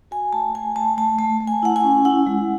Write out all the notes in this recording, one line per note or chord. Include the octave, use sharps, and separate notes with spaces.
F#4 G#5
A3 A5
A3 G#5
A3 A5
A3 A5
A3 A5
A3
G#5
E4 F#5
G#5
C#4
E4 F#5
G#3